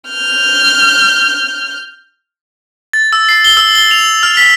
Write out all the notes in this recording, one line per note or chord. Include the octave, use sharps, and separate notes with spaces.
F6 G6
A6
E6
C7
G7
E6
G7
F7
F6
B6